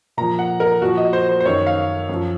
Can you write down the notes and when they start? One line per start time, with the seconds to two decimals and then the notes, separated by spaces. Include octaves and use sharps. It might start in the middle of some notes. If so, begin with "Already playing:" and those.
0.17 A#2 F3 A#5
0.39 F#5
0.60 A#4
0.81 A#2 F3 F#4
0.97 D#5
1.13 C5
1.29 C5
1.40 C5
1.46 F#2 D#3 C#5
1.67 F5
2.09 F#2 F3